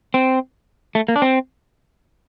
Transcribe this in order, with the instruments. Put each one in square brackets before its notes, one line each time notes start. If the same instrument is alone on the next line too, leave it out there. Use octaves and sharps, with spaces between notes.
[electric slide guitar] C4
A3
A#3
D4
C4